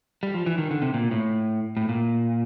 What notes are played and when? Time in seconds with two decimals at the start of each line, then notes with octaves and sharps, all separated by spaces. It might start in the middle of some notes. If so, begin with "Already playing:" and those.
0.23 G3
0.34 F3
0.46 E3
0.58 D#3
0.71 D3
0.82 C3
0.94 A#2
1.11 A2
1.77 A2
1.89 A#2